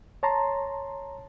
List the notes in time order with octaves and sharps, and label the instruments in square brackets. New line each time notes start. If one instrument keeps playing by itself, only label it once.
[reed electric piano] C#5 A5 A#5 C6